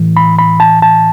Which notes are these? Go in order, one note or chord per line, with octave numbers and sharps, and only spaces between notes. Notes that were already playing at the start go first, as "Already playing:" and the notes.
Already playing: A2 E3
B5
B5
A5
A5